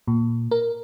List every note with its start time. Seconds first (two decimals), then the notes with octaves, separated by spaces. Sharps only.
0.08 A#2
0.51 A#4